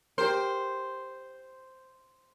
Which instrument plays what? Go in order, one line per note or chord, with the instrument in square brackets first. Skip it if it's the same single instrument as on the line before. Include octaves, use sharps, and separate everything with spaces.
[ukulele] G4 A#4 [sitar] C5